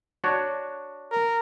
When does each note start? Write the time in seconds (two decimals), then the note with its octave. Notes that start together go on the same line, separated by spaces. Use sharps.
0.24 D4 F#4 C#5
1.11 A#4